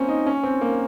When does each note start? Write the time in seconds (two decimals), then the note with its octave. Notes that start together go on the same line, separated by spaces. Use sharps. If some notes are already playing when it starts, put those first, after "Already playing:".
Already playing: A#3 C4 C#4
0.08 D#4
0.26 C#4
0.43 C4
0.61 A#3